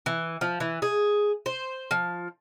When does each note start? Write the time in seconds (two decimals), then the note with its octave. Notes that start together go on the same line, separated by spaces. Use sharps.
0.06 E3
0.41 F3
0.60 E3
0.82 G#4
1.46 C5
1.91 F3